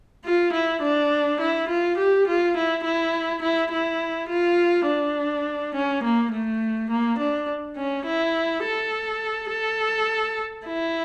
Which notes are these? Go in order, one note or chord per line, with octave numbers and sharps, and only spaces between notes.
F4
E4
D4
E4
F4
G4
F4
E4
E4
E4
E4
F4
D4
C#4
A#3
A3
A#3
D4
C#4
E4
A4
A4
E4